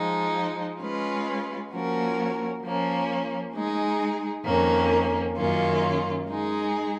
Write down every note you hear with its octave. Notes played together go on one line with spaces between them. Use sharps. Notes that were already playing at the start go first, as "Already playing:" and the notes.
Already playing: F3 G#3 D#4
G#3 C#4 F4 B4
F3 A#3 C#4 F#4 A#4
F3 A#3 C#4
G#3 D#4 G#4
F2 D#3 A#3 C#4
F#2 D#3 A#3 C#4 F4
G#3 D#4 G#4